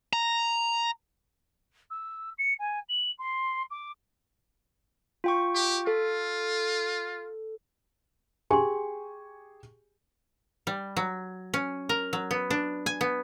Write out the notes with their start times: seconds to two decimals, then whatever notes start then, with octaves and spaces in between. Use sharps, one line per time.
0.13 A#5
1.90 E6
2.38 C#7
2.59 G#5
2.89 F#7
3.19 C6
3.71 D6
5.24 F4 G5 C#6
5.55 G4
5.87 F4 A4
8.50 G4 G#4 G#5 C6 C#6
10.67 G3
10.97 F#3
11.54 C#4
11.89 A#4
12.13 F#3
12.31 B3
12.50 D4
12.86 G#5
13.01 B3